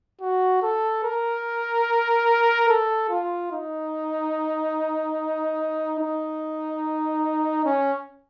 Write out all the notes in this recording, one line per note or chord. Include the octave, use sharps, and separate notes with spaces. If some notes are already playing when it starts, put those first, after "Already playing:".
F#4
A4
A#4
A4
F4
D#4
D#4
C#4